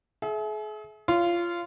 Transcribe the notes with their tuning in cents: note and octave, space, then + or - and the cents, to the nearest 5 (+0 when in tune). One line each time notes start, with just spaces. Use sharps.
G#4 +40 E5 -5
F4 -20 C#5 +15